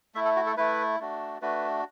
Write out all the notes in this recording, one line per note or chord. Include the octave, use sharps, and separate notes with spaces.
A3 E4 E5
A4
F#4
A4
A3 E4 B4
A3 D4 F#4
A3 D4 F#4 B4